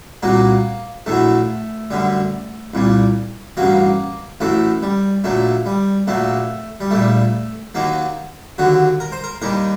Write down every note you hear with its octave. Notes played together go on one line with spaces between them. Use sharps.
C2 A#2 F#3 A#3
A#1 A2 F#3 A3
F#2 D3 G3
C2 A#2 G3
A1 G2 F#3 A#3
A1 A2 F#3 A3
G3
A#1 A#2 F#3 A3
G3
A#1 A#2 F#3 A3
G3
A#1 A#2 G3 A3
D#2 D#3 F#3 A#3
D#2 D3 F#3 F#4
A#4
C5
A#4
D#2 D#3 G3 A#4